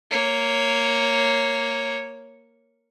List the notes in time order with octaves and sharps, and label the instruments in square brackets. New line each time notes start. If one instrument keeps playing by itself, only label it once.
[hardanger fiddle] A#3 C#5